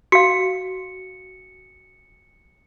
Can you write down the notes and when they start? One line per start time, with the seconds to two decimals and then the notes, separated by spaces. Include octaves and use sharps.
0.12 F#4 F5 C#7